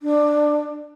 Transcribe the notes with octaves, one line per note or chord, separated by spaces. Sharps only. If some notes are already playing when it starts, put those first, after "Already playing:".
D4